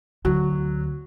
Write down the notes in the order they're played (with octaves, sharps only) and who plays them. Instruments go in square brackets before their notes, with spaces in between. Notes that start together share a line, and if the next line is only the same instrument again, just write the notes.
[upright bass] D2 [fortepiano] F#3